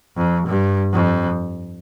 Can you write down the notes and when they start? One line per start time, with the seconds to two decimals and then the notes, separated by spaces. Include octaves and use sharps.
0.17 F2
0.47 G2
0.93 F2